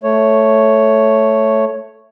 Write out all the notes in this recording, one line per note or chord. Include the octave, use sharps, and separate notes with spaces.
A3 C#5